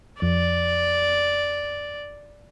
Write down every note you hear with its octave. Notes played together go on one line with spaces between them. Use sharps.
F2 D5